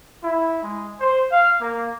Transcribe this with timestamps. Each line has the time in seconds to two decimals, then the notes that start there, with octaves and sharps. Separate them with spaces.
0.22 E4
0.61 G#3
0.99 C5
1.31 F5
1.61 A#3